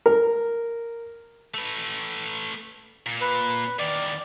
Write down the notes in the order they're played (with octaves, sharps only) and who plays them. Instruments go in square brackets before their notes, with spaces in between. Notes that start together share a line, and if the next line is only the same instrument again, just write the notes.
[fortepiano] A#4
[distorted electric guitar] A3 B4
A#2
[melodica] B4
[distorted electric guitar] E2 D#3 [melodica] D5